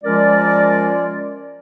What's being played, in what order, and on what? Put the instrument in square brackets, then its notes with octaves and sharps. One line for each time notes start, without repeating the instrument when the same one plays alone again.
[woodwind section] F3 G#3 C#4 F4 A#4 D5